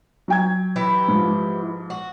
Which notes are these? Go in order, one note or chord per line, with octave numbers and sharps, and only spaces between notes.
F#3 G5 G#6
E3 E4 G4
G#2 F3
F#4